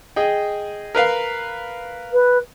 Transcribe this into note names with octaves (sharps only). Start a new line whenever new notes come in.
G#4 D#5 G5
A#4 B4 F5
B4